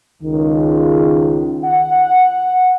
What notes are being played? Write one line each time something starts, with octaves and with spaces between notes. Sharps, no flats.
C#2 D#3
F#5